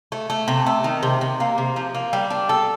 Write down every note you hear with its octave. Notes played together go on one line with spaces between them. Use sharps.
A3
A3
C3
A3
D#3
C3
C3
A#3
C3
F3
A#3
G3
D4
A4